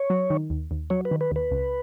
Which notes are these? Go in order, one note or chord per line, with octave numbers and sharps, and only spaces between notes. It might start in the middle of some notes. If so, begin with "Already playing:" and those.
Already playing: C#5
F#3
D#3
D#2
D#2
F#3 C#5
B4
D#3
B4
D#2 B4
C#2